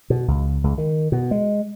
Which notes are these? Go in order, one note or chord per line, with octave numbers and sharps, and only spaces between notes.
B2
C#2
C#2
D#3
B2
G#3